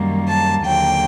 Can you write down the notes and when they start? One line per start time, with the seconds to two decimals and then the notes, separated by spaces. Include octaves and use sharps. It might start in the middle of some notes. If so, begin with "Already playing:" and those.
Already playing: F#2 D#3 G3 A#3
0.27 A5
0.65 D#2 D3 F#3 A#3 G5